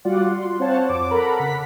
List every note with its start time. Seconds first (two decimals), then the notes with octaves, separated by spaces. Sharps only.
0.05 G3 F4 F#4 D5 F#5
0.26 C6
0.59 C4 F4 C5 C#5 F#5 A5
0.89 F2 D6
1.10 A4 A#4 F#5 A#5 B5
1.39 C#3 F#5 B6